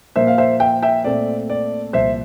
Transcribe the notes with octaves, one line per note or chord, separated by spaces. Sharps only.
A#2 F3 A#3 C5 E5
F5
C5 E5
E5 G5
E5 G5
A#2 A3 C4 D5
D5
C2 A#2 F3 C5 E5